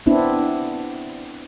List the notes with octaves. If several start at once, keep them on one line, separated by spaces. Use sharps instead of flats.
B3 C4 D4 E4